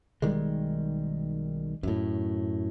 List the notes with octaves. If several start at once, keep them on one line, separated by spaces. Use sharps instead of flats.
B1 D#3 G3 G#3
F#2 A2